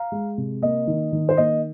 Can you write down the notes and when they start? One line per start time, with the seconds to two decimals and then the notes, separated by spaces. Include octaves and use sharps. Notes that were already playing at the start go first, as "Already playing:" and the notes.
Already playing: F5 A#5
0.12 G#3
0.38 C3
0.62 A#3 D#5
0.87 D#3
1.12 D#3
1.29 C5
1.37 A#3 D#5